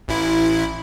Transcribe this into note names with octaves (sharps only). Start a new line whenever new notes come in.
A1 E4